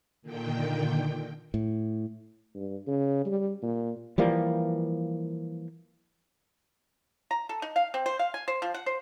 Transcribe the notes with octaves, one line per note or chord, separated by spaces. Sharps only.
A#2 D3 D#3 G5
A2
G2
C#3
G3
A#2
E3 F3 G3 A#3
A#5
A4
D#4
F5
C4
C5
F5
G#5
C5
F3
F#5
C5